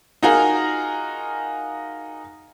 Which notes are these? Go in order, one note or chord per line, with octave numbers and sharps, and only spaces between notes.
D#4 F4 F#4 G#4 A#4